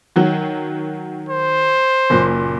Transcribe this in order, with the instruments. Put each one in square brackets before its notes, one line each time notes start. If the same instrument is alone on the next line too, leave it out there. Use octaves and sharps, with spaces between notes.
[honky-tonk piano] D#3 F#3 F#4
[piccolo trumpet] C5
[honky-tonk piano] F#1 A#2